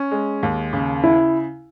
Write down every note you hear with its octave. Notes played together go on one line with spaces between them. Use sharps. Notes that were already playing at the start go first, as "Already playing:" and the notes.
Already playing: C#4
G#3
D#2
C#3
E4